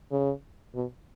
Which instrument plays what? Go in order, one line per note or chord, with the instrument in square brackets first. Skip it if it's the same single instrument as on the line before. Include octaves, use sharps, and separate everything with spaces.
[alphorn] C#3
B2